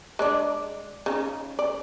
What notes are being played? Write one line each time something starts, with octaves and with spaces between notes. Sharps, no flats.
G#3 D4 D5
C#3 D#4
D5